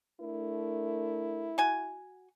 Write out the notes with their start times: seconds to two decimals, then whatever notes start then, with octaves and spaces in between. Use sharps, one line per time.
0.20 A3 D4 E4 A#4
1.58 F#4 G#5